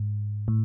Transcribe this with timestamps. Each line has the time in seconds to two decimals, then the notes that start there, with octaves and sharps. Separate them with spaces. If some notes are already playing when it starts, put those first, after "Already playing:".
Already playing: G#2
0.48 A2